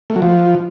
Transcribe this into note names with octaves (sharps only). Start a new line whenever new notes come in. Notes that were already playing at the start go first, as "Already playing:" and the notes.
A3
F#3
F3